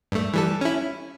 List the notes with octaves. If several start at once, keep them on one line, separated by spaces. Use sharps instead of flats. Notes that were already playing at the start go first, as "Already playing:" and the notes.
G2 A3
E3 G3 A4
C#4 E4